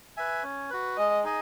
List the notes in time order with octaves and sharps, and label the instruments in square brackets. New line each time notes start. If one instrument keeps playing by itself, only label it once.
[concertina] B4 E5 G#5
C#4
F#4 B4
[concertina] G#3 [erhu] D#5
[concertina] D#4 G#4 D#5